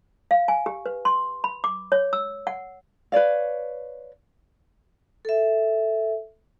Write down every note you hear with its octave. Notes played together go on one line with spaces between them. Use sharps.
F5
G#5
G4
B4
C6
B5
D6
C#5
E6
F#5
B4 C#5 D5 F5
A4 E5